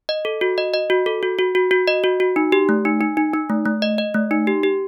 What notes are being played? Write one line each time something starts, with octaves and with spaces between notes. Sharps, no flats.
D#5
A4
F#4
D#5
D#5
F#4
A4
F#4
F#4
F#4
F#4
D#5
F#4
F#4
D#4
G4
A3
D#4
D#4
D#4
D#4
A3
A3
D#5
D#5
A3
D#4
G4
G4